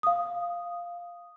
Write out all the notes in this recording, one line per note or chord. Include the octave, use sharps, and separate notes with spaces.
F5 D#6